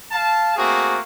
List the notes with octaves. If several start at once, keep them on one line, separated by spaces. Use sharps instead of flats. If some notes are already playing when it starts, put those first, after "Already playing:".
F5 A5
A3 A#3 C4 F#4 G#4